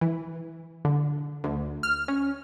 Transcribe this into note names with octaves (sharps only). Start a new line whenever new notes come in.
E3
D3
D2
F6
C#4